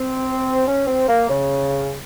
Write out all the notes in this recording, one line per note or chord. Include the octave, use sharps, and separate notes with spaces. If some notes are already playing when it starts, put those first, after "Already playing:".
Already playing: C4
C#4
C4
A#3
C#3